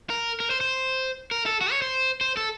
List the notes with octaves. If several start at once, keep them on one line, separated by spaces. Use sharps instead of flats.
A#4
A#4
C5
C5
A#4
A4
F#4
C#5
C5
C5
A4